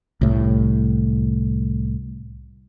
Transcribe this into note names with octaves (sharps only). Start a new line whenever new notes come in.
C2 A2